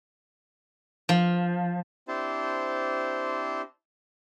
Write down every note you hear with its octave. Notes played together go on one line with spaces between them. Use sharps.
F3
C4 D4 E4 G4 C5 A5